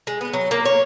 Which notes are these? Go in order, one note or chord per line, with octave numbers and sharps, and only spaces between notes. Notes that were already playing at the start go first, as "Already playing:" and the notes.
G#3
B3
F#3
A#3
C#5